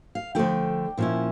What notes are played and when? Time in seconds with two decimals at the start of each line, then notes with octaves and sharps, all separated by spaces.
0.15 F5
0.35 D3 F3 A3 E4 G5
0.98 A#2 F3 C#4 E4